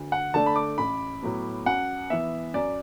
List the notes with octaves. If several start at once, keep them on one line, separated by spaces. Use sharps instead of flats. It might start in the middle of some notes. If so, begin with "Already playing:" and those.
Already playing: D2
F#5
D3 A3 D4 A5
B5
D6
A1 B5
A2 F#3 B3
F#2 F#5
E3 B3 E5
F#2 D5